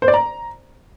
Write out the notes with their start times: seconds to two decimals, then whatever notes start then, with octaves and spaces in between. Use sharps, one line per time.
0.02 C5
0.08 D5
0.14 A#5